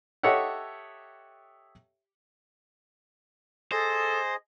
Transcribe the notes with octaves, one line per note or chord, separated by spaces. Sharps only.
G4 A4 C#5 D#5 E5 F#5
G#4 A4 C5 D#5